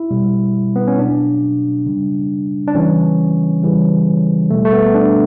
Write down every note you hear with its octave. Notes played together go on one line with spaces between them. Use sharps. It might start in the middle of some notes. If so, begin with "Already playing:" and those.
Already playing: E4
B2 G3
B3
C#4
B2 F#3 D4
C#3 G3
D4
C#3 E3 G3 C#4
C#3 E3 G3
B2 G3 A3
A3
B3
D4